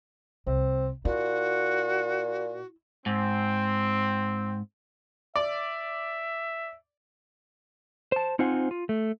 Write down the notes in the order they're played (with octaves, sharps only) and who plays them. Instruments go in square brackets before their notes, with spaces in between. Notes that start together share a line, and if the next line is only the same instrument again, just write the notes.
[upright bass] C2 [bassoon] C4
[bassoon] A#2 [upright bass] E4 [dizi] F#4
[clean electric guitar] G#2 [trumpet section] C4
[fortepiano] D5 [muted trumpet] E5
[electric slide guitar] C5 A5
C4 D#4 F4 C5 F#5 G#5
F4
A3